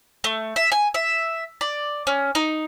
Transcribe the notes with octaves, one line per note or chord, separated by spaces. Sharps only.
A3
E5
G#5
E5
D5
C#4
D#4